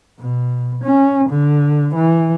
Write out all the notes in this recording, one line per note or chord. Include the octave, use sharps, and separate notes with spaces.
B2
C#4
D3
E3